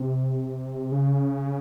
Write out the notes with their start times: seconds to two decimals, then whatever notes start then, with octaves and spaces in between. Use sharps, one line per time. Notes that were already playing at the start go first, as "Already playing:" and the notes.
Already playing: C3
0.92 C#3